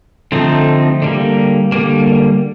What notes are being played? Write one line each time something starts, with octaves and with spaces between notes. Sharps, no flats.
D3 F3 A3 C4 D#4
D3 G3 A#3
D3 G3 A#3